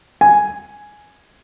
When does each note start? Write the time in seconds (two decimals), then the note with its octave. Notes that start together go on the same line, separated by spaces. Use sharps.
0.21 G#5